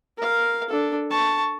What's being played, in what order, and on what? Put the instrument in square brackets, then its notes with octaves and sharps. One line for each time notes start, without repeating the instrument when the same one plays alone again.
[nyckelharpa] A#4 F5
D4 A4
A5 C#6